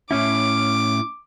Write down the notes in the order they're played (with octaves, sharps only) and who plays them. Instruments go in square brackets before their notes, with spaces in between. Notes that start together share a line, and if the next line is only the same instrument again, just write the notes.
[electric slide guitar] A2 C#4 E4 [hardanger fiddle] D6